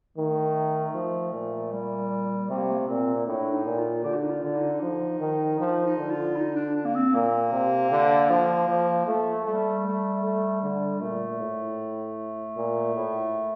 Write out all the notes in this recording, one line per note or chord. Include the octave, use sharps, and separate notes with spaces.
D#3 A3
F3
A#2
G3
C3 A3
A#3
A3
A#3
A3
A#2 C4
C4
A2 D4
D#4
A#2
F4
D3 G4
D4
D#4
F4
D3
D#4
F3
D#3
F3 D#4
D#4
D3
F4
D#4
D4
D4
A#3
C4
A#2 A#3
C3
D3
F3
F3
A3
G3 A3
A3
A3
D3
A#2 A3
A2
A#2
A2